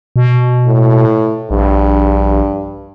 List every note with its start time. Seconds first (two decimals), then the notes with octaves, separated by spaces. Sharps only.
0.16 B2
0.66 A2
1.51 A#1 G2